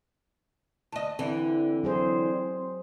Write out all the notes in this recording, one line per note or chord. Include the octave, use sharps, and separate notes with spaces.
D2 D#5 A5
D3 E3 C4
F#3 G#4 C5